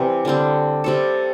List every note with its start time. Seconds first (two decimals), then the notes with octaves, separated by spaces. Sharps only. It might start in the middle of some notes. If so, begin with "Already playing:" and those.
Already playing: C3 E3 G3 C4
0.25 D3 G3 C4
0.84 C3 G3 C4 A4